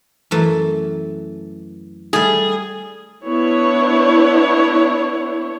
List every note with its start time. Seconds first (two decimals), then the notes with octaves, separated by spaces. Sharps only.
0.31 F#2 E3 A3
2.13 G3 A3 G#4
3.27 B3 D4 E4 C#5